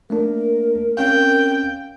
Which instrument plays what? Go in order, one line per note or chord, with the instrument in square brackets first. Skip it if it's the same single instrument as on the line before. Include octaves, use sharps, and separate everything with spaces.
[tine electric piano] A3 A#3 D4 [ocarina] A#4
[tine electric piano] C4 C#4 F5 [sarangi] G5